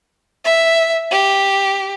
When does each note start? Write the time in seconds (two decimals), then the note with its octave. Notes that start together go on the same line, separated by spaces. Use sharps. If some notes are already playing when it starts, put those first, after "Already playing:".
0.45 E5
1.11 G4